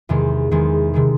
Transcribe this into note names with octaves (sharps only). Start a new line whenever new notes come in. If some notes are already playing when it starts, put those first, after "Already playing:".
E2 C3 D#3 G#3
E2 C3 D#3 G#3
C3 D#3 G#3